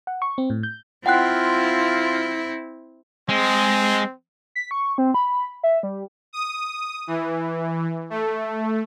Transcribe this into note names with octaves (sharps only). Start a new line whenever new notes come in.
F#5
C#6
C4
A2
G6
C4 E4 F4 F#5 G5 F#6
G#3 C4
B6
C#6
C4
B5
E5
G3
D#6
E3
A3